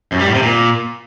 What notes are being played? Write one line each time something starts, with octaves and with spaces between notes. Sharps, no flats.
F#2
G3
A2
C3
A#2